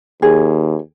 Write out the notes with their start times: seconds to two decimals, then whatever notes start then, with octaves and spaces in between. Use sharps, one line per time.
0.22 D#2 G#4